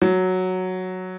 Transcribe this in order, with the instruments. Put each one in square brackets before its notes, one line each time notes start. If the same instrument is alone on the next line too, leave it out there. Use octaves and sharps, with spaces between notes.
[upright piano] F#3